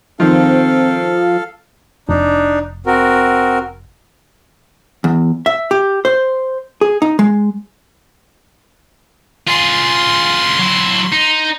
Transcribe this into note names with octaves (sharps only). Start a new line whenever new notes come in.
D#3 F3 C4 A4 F5
F1 D4 D#4
C4 F#4 A#4
E2
E5
G4
C5
G#4
D#4
G#3
F4 G#4 C6
F#3 E4
D#4